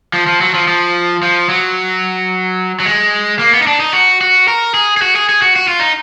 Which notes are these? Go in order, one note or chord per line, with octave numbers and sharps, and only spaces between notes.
F3
F3
F#3
F3
F3
F3
F#3
F#3
G#3
A#3
B3
D#4
D4
D#4
F#4
F#4
A#4
G#4
G#4
F#4
G#4
G#4
F#4
F#4
F4
D#4